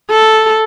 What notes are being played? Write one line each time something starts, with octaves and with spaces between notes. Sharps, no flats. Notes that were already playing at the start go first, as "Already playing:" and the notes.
A4